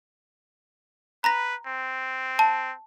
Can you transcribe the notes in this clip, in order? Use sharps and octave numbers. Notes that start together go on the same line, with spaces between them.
B4 A#5 B5 A#6
C4
A5